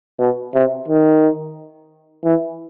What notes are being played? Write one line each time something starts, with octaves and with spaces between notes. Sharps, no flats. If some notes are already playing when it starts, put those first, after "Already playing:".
B2
C3
D#3
E3